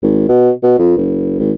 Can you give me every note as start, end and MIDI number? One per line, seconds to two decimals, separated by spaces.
0.03 0.28 32
0.28 0.50 47
0.63 0.76 47
0.78 0.96 41
0.97 1.39 30
1.39 1.52 32